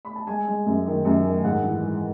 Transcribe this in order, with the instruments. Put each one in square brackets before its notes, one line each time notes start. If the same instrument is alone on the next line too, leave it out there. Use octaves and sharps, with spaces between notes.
[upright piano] B5
A5
G#3 G#5
G#3
F#2
D#3
F#2
D#3
G#2 F#5
E3
G#3